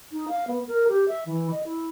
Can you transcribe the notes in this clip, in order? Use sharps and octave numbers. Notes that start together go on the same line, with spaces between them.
D#4
F5
B3
A#4
G4
E5
E3
D#5
E4